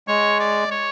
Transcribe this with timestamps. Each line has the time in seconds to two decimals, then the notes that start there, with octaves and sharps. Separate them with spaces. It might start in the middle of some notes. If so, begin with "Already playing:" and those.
0.08 G#3 C#5
0.40 D5
0.71 C#5